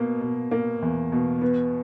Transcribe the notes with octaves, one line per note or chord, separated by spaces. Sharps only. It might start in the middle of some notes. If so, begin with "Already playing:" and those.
Already playing: B2 A#3
B2
A#3
E2
B2
B3